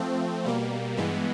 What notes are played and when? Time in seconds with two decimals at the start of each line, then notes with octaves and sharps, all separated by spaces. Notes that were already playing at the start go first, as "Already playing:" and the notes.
Already playing: F3 A3 C4
0.45 B2 G3 A#3
0.97 G2 E3 G#3 B3